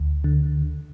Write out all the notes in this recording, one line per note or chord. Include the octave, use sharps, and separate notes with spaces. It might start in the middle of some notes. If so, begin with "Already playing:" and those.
Already playing: D2
D3